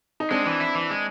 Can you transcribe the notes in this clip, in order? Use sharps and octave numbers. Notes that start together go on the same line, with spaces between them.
D#4
G#3 C4 D4
E3
E4
E3
G#3